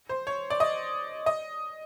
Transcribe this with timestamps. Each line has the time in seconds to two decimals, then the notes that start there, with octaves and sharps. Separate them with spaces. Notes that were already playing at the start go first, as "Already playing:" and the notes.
0.09 C5
0.27 C#5
0.50 D5
0.60 D#5
1.26 D#5